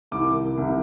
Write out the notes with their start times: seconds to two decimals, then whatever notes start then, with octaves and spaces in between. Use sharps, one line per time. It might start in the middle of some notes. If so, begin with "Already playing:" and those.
0.11 C2 C3 D#3 D6
0.57 C2 C3 D#3